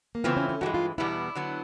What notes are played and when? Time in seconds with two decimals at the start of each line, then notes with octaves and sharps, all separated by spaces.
0.15 A#3
0.24 C#3 E3 A3 B3 C4 F4
0.37 C#4
0.49 C#4
0.61 G2 E3 G#3 F#4
0.74 F4
0.98 E2 B2 G3 B3 E4
1.35 D3 F#3 B3